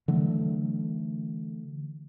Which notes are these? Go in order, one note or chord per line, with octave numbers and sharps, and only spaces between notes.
D3 E3 F#3 A3